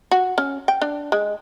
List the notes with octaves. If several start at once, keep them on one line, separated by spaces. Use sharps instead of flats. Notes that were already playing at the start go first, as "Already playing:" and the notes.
F#4
C#4
G5
D4
G#3